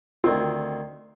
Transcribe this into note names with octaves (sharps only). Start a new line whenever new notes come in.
D2 D#3 C4 F4